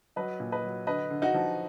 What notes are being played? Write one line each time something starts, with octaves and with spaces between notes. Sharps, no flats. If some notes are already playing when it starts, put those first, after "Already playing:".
F#3 B4 D#5
A#2
B4 D#5
F#3
D3 B4 D#5
D3
D#4 F#4
F3